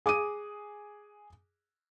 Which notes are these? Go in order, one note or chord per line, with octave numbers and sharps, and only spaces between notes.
G#4 D6 D#6 D#7